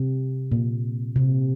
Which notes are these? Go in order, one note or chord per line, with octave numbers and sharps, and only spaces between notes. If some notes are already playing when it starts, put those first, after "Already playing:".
Already playing: C3
A#2
C3